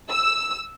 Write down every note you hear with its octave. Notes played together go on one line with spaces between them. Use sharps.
E6